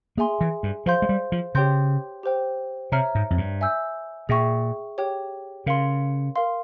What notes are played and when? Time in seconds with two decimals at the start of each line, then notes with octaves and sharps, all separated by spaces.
0.17 A#3 G#4 E5 G#5 C6
0.41 E3
0.63 G2
0.86 F3 C5 F5 C6 G6
1.02 G#3
1.09 G3
1.32 F3
1.55 C#3 G4 C#5 G5 C6 G6
2.23 G4 C5 G5
2.92 C3 C#5 E5 A#5 F6
3.15 G#2
3.30 F2
3.38 G2
3.61 E5 G#5 E6 G6
4.29 A#2 G#4 E5 G5 C#6
4.98 G4 C#5 G5
5.66 C#3 A#4 F5 C6
6.36 A#4 F5 C6